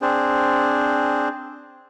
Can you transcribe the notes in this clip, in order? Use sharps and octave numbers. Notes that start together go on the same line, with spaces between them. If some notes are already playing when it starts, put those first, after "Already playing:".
C4 D4 G#4 C5